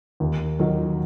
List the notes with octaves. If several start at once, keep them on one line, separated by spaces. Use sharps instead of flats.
D#2
D#3 F#3